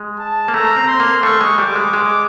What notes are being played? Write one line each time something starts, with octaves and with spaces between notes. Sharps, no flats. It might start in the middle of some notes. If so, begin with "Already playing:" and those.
Already playing: G#3
A5
A#3
A3 A#5
C4
C6
A#3
A3 C#6
G#3
G3 D6
G#3
G#3